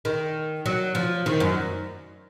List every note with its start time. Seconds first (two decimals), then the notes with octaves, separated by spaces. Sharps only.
0.05 D#3
0.66 F#3
0.95 F3
1.26 D#3
1.40 F#2